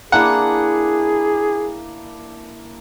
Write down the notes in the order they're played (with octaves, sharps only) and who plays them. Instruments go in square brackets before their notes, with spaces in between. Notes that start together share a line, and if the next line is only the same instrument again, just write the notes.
[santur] A#3 D4 E4 [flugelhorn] G#4 [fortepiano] F#5